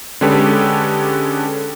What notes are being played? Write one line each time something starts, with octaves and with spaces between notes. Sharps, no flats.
D3 G#3 C#4 G4 A4 B4